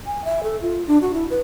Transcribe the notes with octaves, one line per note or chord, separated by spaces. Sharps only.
G#5
E5
A4
F4
D4
F#4
E4
B4